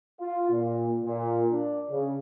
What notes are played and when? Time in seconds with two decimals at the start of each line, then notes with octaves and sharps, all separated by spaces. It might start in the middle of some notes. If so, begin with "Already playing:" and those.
0.20 F4
0.50 A#2
1.04 A#2
1.51 D4
1.90 C#3